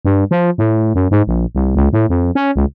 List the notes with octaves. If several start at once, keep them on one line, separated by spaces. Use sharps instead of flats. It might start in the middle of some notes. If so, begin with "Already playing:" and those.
G2
F3
A2
F#2
G#2
A#1
C2
C#2
A2
F2
C#4
C#2